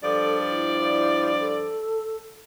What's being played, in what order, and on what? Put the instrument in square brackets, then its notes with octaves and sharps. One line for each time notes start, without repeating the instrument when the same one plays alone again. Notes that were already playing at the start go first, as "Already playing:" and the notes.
[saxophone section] G2 F3 D5 [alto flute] A4
[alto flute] E4
A4